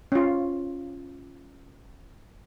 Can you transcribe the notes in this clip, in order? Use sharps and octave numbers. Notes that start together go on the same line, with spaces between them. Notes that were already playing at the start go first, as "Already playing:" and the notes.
C#4 F4